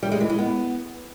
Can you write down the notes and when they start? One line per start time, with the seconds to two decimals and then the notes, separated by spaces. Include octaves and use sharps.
0.03 G3
0.12 G#3
0.21 E3
0.30 G#3
0.39 B3